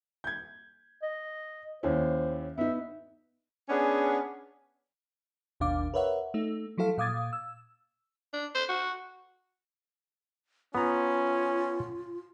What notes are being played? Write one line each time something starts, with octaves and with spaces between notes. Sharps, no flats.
G6 G#6
D#5
D#2 C#4 E4 C5
B3 D#4 E5
B3 C#4 D4 G#4
G#1 D#2 B2 D4 F5 D6
A#4 B4 C#5 E5 F#5
A3 D#4
F3 F#3 E4 A4 F5
A#2 F5 D6 D#6 G#6 A6
E6
D4
C5
F#4
B3 C#4 F4 A#5